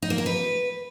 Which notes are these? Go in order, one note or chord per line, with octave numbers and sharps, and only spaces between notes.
D#4
A#3
A#4
B4